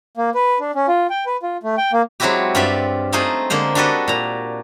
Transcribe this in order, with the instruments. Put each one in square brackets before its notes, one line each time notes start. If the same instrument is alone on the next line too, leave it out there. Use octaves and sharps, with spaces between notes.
[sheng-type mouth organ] A#3
B4
D4
C#4
F4
G5
B4
F4
A3
G5
A#3
[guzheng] F#3 G#3 C4 E4 F#4 G4
G2 C4 F4 G4 D5 E5
A3 C4 D#4 F4 G#4
D3 G#3 A#3 C5
D4 F#4 G4 A4 B4 D#5
A#2 A#5